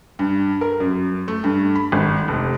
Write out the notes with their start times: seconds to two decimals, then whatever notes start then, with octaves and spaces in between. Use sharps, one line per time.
0.19 G2
0.61 A#4
0.80 F#2
1.28 A3
1.44 G2
1.75 B5
1.92 G#1
2.28 F1